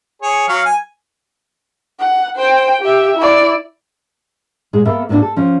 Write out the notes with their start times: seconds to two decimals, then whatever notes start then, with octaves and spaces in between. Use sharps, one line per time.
0.22 G#4 C#5
0.48 F#3 F5
0.65 G#5
2.00 F#5
2.36 C5 G5
2.81 G4 E5
3.17 E4 D5
4.73 A#2 G#3 G#4
4.85 A#3 B3 A4 A#4 E5
5.09 A2 A#3 B3 C#4 D4 F#4
5.22 A4
5.36 F3 C#4